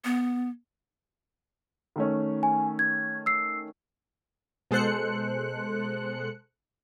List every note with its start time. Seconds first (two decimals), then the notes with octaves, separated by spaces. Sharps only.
0.05 B3
1.96 D#3 A3 C#4
2.43 G#5
2.79 G#6
3.26 E6 C7
4.71 B2 G#3 A4 C5 F#6 C#7